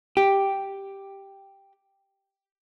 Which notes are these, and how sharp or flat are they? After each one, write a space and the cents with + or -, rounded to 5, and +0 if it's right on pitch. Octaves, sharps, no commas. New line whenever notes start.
G4 +0